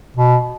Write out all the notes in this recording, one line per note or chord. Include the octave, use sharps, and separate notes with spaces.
B2